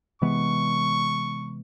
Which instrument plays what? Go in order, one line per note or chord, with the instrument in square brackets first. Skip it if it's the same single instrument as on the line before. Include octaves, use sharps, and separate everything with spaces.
[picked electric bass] C3 E3 G#3 B3 [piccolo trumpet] C#6